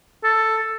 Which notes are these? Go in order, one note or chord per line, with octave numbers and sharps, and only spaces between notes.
A4